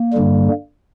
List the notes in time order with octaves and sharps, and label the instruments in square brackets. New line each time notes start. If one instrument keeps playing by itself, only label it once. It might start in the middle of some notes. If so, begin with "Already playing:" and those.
Already playing: [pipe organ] A#3
G2 D3 G3